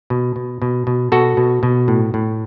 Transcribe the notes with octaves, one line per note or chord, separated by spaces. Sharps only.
B2
B2
B2
B2
B2 F#4 A4
B2
B2
A2
A2